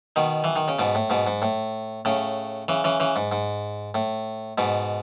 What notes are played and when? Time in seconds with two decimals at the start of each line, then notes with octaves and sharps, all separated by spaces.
0.16 B2 D#3
0.44 E3
0.56 D#3
0.68 C#3
0.79 G#2 B2
0.95 A2
1.10 G#2 B2
1.27 G#2
1.42 A2
2.05 A2 C#3
2.68 C#3 E3
2.84 C#3 E3
3.00 C#3 E3
3.16 G#2
3.32 G#2
3.94 A2
4.58 G#2 B2